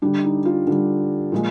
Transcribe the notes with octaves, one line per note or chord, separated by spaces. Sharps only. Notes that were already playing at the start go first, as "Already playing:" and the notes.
D3 G3 D4
D#4
F4
D3 G3
A#2 F3 G#3